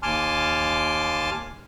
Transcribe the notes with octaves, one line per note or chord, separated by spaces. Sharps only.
D#2 G#5 A5 C6 D6 F6